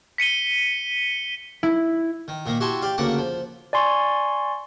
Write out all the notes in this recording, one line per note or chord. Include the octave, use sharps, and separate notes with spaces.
B6 C#7 D#7 G7
E4
D#3
A#2 D#3 A#3
E4 F#4 G4 G#5 A5 C6
G4 D5 F5 G5
D2 C#3 A#3 F#5 A5 D6
F3
D5 G#5 C6 C#6